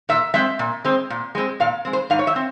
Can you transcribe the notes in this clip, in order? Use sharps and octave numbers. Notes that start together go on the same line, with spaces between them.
A#2 E5
G#3 C4 E5
A#2
G#3 C4
A#2
G#3 C4
A#2 F5
G#3 C4
C5
G#2 F5
C#5
E5
C4